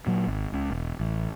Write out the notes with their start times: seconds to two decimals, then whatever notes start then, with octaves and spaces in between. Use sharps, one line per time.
0.07 A#2 F#3
0.27 G#1
0.53 C#2 C#3
0.70 E1
1.00 A1